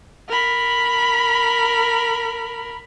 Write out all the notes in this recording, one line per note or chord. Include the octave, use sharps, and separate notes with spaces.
A#4 B5